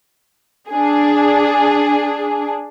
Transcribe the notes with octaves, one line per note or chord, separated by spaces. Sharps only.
D4 G#4